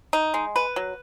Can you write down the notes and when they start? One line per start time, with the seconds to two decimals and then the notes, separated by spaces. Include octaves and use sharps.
0.13 D#4
0.34 G#3
0.56 B4
0.76 F#3